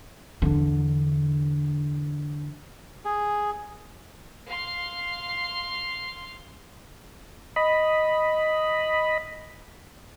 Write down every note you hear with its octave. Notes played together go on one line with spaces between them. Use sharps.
E2 D3
G#4
F5 C6
D#5 B5